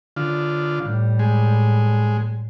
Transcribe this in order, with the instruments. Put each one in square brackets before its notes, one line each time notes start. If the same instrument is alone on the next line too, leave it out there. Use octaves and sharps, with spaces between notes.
[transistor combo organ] D3 F4
[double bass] A2 G3
[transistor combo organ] G#3